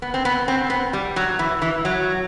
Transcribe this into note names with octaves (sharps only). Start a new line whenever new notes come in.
B3
C4
B3
C4
B3
G3
F#3
E3
E3
F#3